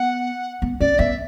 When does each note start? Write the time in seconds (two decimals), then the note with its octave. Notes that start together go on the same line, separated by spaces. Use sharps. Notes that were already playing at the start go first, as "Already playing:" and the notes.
Already playing: B3 F#5
0.62 B3
0.80 C#4 D5
0.99 B3 E5